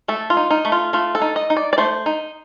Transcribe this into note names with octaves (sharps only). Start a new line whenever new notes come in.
A3 A4
F4
D#4
D#4
A3
F4
A3 F4
A4
D#4
D#5
D#4
D5
D5
A3 C5
D#4